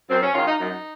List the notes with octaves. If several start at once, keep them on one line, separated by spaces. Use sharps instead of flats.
F#2 C4
C#4
D#3 G#3 F4
D#4
F#2 D#4